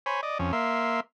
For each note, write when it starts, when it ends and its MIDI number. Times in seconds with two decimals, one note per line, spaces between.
0.06 0.21 72
0.06 0.21 73
0.06 0.21 80
0.06 0.21 83
0.23 0.38 74
0.23 0.38 75
0.39 0.52 41
0.39 0.52 61
0.53 1.00 58
0.53 1.00 76
0.53 1.00 84